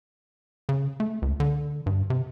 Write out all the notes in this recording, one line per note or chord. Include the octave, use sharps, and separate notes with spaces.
C#3
A3
C#2
D3
G2
C3